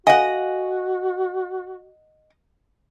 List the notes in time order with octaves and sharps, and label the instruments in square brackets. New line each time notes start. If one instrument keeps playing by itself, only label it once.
[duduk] F#4 [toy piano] A4 F5 G#5 [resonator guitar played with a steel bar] D#5 F#5